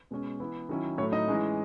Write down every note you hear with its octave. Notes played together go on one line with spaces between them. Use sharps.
B2 G#3 C#4
E3 B3 E4
D#3 F#3 C#4 E4
A2 F#3 A3 C#5
D#4 D#5
E3 G#3 C#4 E4